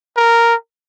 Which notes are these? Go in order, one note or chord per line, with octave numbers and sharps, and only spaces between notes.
A#4